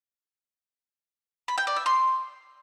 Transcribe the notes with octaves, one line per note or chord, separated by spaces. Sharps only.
B5
G5
D5
E5
C6